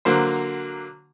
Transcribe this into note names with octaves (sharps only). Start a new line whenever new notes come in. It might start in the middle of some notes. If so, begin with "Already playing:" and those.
D3 F#3 A#3 C5